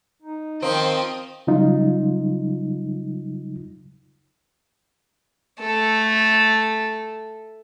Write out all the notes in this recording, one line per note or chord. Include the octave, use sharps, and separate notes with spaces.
D#4
D#3 F3 C4 D#5 G5
C#3 F#3 G3 D#4 F4
A3 A4